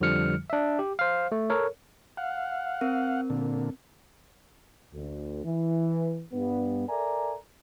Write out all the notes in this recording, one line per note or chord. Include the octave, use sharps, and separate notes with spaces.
F2 D3 F3 G3 F6 C#7
D4 E5
G4
C5 F5
A3
A4 A#4 C#5
F5 F#5
C4 A#4
A#2 D3
D2
E3
G2 B3
A4 A#4 D5 E5 G#5 A#5